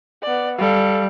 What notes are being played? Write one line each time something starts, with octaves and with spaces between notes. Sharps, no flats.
B3 D5
G3 A4 F5